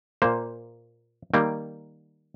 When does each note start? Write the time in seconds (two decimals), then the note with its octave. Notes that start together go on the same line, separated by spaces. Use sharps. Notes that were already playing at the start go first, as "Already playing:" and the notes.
0.22 A#2 A#3 C5
1.34 D#3 G3 A#3 G5